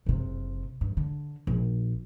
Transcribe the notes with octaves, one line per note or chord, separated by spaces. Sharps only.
F#1 C3
G2
D3
A#1